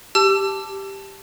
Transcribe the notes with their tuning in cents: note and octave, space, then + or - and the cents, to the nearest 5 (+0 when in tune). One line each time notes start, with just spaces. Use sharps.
G4 +0 A5 +0 E6 +30